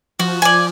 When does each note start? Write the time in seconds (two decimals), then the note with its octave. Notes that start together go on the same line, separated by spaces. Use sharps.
0.19 F3 F#4
0.42 D5 G#5